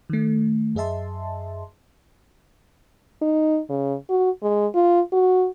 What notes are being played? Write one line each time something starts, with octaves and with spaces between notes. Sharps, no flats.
D#3 A3
F#2 G#4 D#5 E5 A5 C6
D#4
C#3
F#4
G#3
F4
F#4